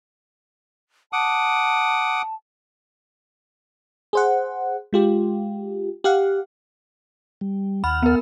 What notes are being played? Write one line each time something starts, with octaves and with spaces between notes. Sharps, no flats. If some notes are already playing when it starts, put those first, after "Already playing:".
F#5 A5 D6 D#6
G#4 C5 F#5
G#3 F4 G4
G4 F5 F#5
G3
D#2 F#5 B5 F6
B3 A#4